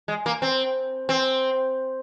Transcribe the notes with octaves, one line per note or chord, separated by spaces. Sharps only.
G#3
A#3
C4
C4